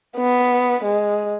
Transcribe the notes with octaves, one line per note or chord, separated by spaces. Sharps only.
B3
G#3